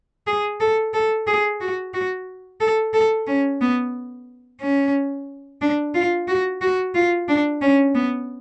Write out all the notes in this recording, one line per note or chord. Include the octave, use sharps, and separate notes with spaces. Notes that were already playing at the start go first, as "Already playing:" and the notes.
G#4
A4
A4
G#4
F#4
F#4
A4
A4
C#4
B3
C#4
D4
F4
F#4
F#4
F4
D4
C#4
B3